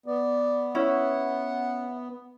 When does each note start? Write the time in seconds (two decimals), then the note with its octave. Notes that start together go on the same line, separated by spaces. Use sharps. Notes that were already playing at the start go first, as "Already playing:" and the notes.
0.06 B3 D5
0.75 C#4 E4 F#5